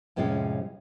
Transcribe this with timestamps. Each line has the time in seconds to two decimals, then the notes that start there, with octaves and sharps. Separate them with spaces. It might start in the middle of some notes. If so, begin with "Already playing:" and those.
0.16 F2 A2 C3 G#3 C#4 F4